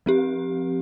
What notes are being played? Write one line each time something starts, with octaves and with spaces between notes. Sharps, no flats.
F3 C4 G4